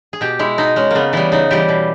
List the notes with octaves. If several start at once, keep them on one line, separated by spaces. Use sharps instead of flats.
G#4
B2 G4
G#3 E4
B2 D#4
G#3 C#4
C#3 A#3 B3
E3 G3 B3
C#3 D#4
E3 G3 G4
B2